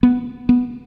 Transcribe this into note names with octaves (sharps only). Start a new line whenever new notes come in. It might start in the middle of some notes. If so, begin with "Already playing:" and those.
B3
B3